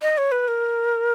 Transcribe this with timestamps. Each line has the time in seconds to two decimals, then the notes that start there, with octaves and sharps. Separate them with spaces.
0.02 D#5
0.18 C#5
0.32 B4
0.48 A#4